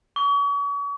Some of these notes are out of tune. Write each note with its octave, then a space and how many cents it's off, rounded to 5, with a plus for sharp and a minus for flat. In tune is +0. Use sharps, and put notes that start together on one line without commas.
C#6 +40